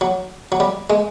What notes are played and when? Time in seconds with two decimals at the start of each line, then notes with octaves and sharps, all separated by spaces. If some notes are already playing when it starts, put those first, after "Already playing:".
0.01 F#3
0.52 F#3
0.60 G3
0.90 G#3